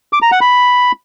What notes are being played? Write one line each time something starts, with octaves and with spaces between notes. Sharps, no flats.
D6
A#5
F#5
B5